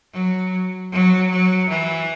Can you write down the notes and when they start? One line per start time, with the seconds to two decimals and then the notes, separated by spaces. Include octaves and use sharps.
0.13 F#3
0.92 F#3
1.31 F#3
1.69 E3